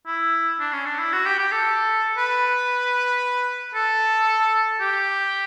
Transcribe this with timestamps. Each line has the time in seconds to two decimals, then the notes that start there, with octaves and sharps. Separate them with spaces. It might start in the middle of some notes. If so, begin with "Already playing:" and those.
0.07 E4
0.60 D4
0.73 C#4
0.86 D4
0.99 E4
1.13 F#4
1.26 G4
1.39 G4
1.52 A4
2.18 B4
3.75 A4
4.81 G4